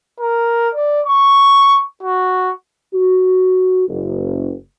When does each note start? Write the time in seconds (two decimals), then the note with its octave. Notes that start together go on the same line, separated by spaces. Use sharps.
0.20 A#4
0.75 D5
1.06 C#6
2.03 F#4
2.94 F#4
3.88 F#1